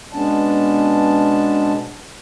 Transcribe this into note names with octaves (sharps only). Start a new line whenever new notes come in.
B2 G#3 B3 C#4 D4 A5